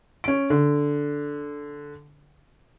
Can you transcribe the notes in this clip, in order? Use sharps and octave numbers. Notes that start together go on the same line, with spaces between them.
C#4 D7
D3